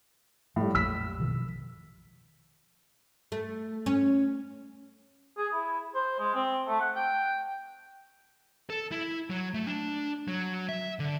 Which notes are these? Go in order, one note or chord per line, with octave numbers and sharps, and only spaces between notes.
A2 F3 G3
A#1 F2 F#3 E6 B6
B2 D#3 F3
A3
C#4
G#4
E4
C5
G#3
C4
A3
F#5
G5
A4
E4
F#3
A3
D4
F#3
E5
D3